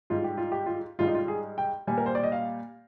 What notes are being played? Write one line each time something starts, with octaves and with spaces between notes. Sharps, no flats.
G#2 G3 F4
G4
F4
G4
F4
G#2 G3 F4
D#4
F4
G#4
G5
A#2 G3 G#5
A#4
C5
D5
D#5
F5